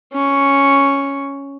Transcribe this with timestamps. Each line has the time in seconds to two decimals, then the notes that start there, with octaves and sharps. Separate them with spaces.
0.13 C#4 C#6